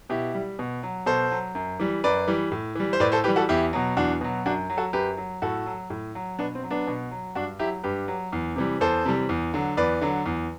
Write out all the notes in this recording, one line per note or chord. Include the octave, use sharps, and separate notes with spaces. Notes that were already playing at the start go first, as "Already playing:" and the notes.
B2 E4 G4
G3
B2
F#3
B2 A4 C5
F#3
F#2
E3 G3
F#2 B4 D5
E3 G3
A2
E3 G3
C5
A2 B4 D5
A4 C5
E3 G3 G4 B4
F#4 A4
E2 E4 G4
B2 F#3
E2 D4 F#4
B2 F#3
F#2 D4 F#4
F#3
F#4 A4
F#2 G4 B4
F#3
A2 F#4 A4
F#3
A2
F#3
B2 B3 D4
C4
F#3
B3 D4
B2
F#3
G2 D4 F#4
F#3 E4 G4
G2 G4 B4
F#3
E2
C3 E3 G3
E2 A4 C5
C3 E3 G3
E2
D3 F#3
E2 B4 D5
D3 F#3
E2